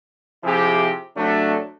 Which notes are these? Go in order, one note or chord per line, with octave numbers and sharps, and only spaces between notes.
C3 F3 E4 G4 G#4
C3 F#3 A3 D4